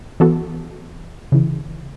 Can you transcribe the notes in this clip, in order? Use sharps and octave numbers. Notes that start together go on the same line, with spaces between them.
E3 B3 F#4 A4
C#3 E3